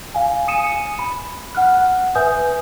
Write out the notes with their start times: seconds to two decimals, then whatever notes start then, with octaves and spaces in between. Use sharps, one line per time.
0.14 F5 G#5
0.48 G#5 D#6 C#7 D#7 E7
0.99 B5
1.55 F#5 F6 F#6
2.15 B4 E5 G#5 D#6 G6